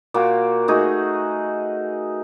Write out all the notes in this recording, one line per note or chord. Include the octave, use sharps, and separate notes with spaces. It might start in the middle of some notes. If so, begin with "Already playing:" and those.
A#2 A#3 F#4 G5
A3 D#4 F#4 G#4